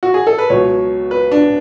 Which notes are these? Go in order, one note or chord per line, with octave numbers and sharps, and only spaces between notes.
F#4
G#4
A4
B4
C#2 B2 F#3 C#5
B4
D4